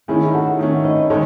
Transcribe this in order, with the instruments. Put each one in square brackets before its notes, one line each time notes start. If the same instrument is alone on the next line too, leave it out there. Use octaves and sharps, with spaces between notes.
[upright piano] D#3 A3 C#4 [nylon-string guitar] E4 G#4
[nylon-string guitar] F#4 A4
[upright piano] D#3 A3 C#4
[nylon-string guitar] B4 D#5
[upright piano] D#3 G#3 [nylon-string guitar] A4 C#5